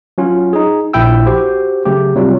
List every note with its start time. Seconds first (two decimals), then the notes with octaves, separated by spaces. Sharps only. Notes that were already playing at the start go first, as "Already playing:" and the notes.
0.18 F#3 C#4 F4
0.53 D#4 G#4
0.94 A#1 A#2 E4 G5 E6
1.26 F#4 G4 C5
1.85 C#3 F#3 A3 G4
2.15 C3 F#3 G3 F4